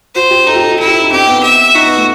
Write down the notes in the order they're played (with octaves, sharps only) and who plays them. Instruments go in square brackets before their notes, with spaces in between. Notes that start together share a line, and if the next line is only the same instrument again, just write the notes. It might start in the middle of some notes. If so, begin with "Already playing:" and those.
[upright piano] F#4 [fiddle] C5
[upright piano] G4
[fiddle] D#4 [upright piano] A4
[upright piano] G4
A4
G4
[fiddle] E4 [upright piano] A4
[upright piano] G4
A4
D#4
[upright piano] C4 [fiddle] G4
[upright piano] B3
[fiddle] E5
[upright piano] D#4 [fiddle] F#4
[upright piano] B3
A3